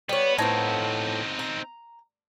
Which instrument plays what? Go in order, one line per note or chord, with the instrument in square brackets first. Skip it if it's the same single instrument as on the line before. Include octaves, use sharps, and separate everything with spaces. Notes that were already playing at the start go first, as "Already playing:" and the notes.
[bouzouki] G3 C#5 [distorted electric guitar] B3
[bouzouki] A2 F3 B3 [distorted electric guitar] C4 D#4
[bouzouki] A#5